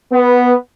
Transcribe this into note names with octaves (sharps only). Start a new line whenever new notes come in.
B3